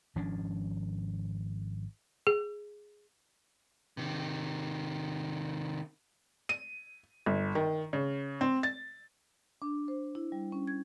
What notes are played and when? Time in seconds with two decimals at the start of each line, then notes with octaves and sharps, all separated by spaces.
0.16 G#1 F3 C#4 D4
2.27 G#4
3.97 C3 D#3
6.49 D#7
7.26 G1
7.55 D#3
7.93 C#3
8.41 C4
8.63 A6
9.62 D4
9.88 C5
10.15 E4
10.32 G3
10.52 C#4
10.67 G#6